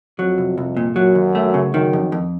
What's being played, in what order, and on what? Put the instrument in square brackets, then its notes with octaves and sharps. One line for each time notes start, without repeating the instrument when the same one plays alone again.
[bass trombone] F2 [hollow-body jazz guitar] F#3
[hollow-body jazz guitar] C2
C2
A#2
[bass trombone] F#2 [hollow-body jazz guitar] F#3
[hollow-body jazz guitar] D#2
A3
C#3
[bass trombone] F#2 [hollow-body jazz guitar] D#3
[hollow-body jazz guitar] F2
F2